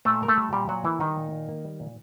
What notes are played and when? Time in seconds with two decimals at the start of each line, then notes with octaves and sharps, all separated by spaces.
0.05 A#2 A3 A4
0.21 A#3 A#4
0.28 A3 A4
0.37 G3
0.53 A#2 G3 G4
0.69 A#2 F#3 F#4
0.84 E3 A#3 E4
1.00 D#3 G3 D#4
1.16 A#2
1.32 A#2
1.49 A#3
1.65 G3
1.80 A#2